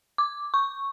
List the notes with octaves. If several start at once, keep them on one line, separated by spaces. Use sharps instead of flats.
D6
C#6